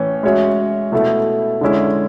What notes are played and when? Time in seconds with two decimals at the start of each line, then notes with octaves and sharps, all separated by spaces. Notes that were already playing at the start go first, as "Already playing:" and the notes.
Already playing: A2 E3 A3 C#4
0.23 G#3 C#4 F#4 C#5 E5
0.92 B2 A3 E4 A4 E5
1.61 D3 G#3 C#4 E4